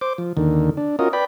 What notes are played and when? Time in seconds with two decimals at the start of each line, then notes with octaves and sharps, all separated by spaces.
0.01 C5 D6
0.18 F3
0.37 D#2 D3 D#3
0.77 D4
0.99 C#4 F4 F#4 A#4 D#5
1.13 B4 D5 G5 B5